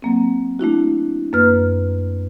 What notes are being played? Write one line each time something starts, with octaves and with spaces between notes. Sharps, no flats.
F#3 A#3 C4
A3 D4 E4 F#4
F#2 A#3 B4 F6